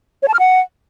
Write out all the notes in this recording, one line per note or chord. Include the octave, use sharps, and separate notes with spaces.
C#5
A5
F6
F#5